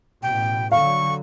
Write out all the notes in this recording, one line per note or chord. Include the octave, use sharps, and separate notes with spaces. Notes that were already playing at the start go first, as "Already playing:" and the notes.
A1 B2 G5
D3 F#3 F5 C#6